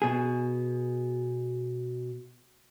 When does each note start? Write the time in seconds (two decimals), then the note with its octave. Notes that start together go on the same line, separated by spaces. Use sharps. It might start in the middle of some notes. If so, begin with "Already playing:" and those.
0.02 B2 G#4